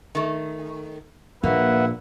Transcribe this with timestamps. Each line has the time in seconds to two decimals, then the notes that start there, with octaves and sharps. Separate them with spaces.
0.15 D#3 A3
1.43 A#1 A#2 A#3 B4 E5 F#5